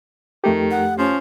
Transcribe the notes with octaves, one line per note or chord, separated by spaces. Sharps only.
F2 D#3 A3 G4
F#5
F3 C#4